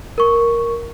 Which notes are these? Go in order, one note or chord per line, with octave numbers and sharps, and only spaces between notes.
A#4 C#6